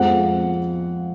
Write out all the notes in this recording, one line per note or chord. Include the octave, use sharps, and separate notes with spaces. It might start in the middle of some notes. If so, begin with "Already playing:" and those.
Already playing: F2 F3 G#3 F#5